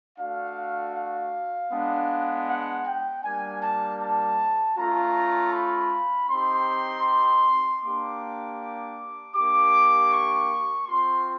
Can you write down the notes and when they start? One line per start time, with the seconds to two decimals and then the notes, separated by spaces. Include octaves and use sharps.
0.18 A3 D4 F#4 F5
0.95 F5
1.71 G#3 B3 D4
2.48 F#5
2.86 G5
3.24 G3 A#3 D4 G#5
3.62 A5
4.01 A5
4.77 A3 C#4 F4 A#5
5.53 B5
6.29 C4 D#4 G4 C6
7.82 A#3 D4 G4 D6
9.35 A#3 D4 G4 D6
10.12 C#6
10.88 C4 F4 C6